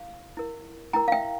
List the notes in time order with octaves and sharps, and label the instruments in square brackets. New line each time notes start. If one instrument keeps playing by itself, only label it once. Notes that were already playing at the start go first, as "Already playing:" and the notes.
Already playing: [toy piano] E4 F5
E4 A#4
E4 A#4 G5 A#5
F5
E5 G5